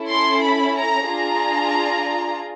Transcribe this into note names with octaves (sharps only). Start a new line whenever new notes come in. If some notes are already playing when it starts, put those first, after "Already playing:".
Already playing: C#4 E4 A4
C6
B5
A#5
D4 F4 G#4 A#5